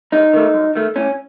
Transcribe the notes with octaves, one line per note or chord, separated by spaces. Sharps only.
F#2 D#4
D#3 A3
F#2
D#3 A3
A2 C#4